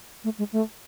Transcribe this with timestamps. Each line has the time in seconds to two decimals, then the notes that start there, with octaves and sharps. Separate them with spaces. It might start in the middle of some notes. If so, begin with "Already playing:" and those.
0.24 A3
0.38 G#3
0.53 A3